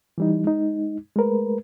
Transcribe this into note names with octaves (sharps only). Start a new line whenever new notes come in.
E3 G3 D#4
G#3 D#4
G#3 A3 A#4 B4